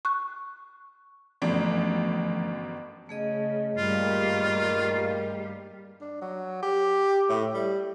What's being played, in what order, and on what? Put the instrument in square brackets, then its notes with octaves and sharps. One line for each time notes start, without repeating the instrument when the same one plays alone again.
[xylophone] C#6 F#6
[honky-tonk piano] G1 F#2 [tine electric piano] E3 F3 A3 [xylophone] D5
[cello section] C#3 [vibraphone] A3 G#4 D#5
[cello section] G2 G3 [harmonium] A#2 D#3 A#3 [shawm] F4
[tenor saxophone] D4
F#3
G4
A2
G3